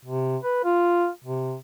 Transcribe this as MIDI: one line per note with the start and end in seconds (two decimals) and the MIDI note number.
0.05 0.37 48
0.44 0.61 71
0.64 1.09 65
1.24 1.56 48